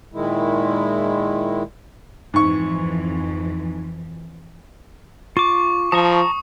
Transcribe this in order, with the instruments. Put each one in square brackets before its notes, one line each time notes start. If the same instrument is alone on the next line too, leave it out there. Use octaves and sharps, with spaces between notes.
[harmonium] A#2 D#3 G#3 E4
[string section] F2 E3 [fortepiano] G#2 C#6
[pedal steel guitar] F4 D6 [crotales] C#6
[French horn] F3 [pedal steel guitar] A5 A#5 C#6 [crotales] D#6